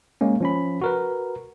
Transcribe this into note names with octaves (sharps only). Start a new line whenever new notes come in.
G#3 A#3 C#4
F3 C#4 B5
F#4 A#4 B4